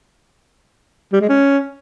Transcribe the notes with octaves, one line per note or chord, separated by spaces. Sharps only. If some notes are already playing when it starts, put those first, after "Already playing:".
G3
G#3
C#4